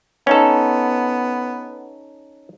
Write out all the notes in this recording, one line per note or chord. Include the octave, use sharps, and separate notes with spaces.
B3 C#4 D#4 A4